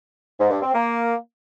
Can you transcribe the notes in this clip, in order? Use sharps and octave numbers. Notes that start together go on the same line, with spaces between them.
G#2
G2
C4
A#3